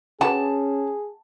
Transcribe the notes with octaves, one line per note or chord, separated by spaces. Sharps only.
C#4 F#4 G#4 B4 A5